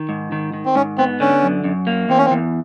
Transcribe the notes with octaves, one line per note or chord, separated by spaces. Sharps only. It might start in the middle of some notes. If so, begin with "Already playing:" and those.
Already playing: D#3
G#2
D#3
D#3
C4
G#2 C#4
B3 C4
D3 C#4
F#2
F#2
A#3
E2 C4
C#4
C4
E2